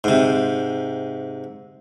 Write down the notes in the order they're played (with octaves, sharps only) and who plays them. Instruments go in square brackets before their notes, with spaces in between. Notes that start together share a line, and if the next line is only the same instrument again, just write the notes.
[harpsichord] G#2 C3